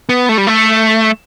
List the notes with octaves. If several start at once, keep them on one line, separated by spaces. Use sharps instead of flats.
B3
A3
G3
A3